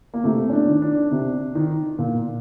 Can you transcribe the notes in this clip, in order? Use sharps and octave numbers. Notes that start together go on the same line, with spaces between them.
A#3
C3 A3
C#4
D4
D#3
D4
C3
D#3
A#2